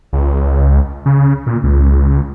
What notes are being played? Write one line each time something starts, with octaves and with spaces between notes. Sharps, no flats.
C#2
C#3
A#2
C#2